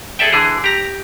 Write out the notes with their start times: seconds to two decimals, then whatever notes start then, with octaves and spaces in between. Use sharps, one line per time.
0.19 G#4 A4 D5 E5 G5
0.33 D3 E3 G#4
0.64 G4 A#5